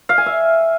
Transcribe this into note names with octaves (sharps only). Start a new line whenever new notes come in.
F5
G#5
E5